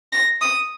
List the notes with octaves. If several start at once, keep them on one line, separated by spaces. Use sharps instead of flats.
A#6
D#6